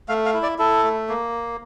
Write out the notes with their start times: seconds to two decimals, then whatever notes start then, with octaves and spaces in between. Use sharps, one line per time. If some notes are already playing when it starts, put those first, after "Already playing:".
0.09 A3 F5
0.26 F5
0.34 E4
0.43 D5
0.58 E4 A4
0.83 A3
1.09 A#3